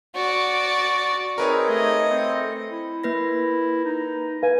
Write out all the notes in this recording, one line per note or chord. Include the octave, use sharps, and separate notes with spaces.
F#4 D5
C4 D#4 G#4 A#4 B4 C#5
A3 D#5
C4
E4
A#3 B4 A#6
D#4
B4 F5 G#5